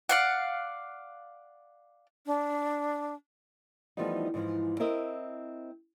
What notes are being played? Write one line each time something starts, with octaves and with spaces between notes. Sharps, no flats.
D5 F5 F#5
D4
E3 F3 G3 A3 B3 D#4
G#2 E3 F3
C4 E4 A#4 D#5